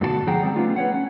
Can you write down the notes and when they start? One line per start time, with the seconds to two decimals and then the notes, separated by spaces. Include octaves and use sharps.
0.01 G2 B2 D3 F#4 A4 A5
0.27 D3 F3 G#4 F#5 G5 A#5
0.43 G3 C4
0.56 A3 B3 C#4 D4 F4
0.76 B4 C#5 F#5
0.94 C#4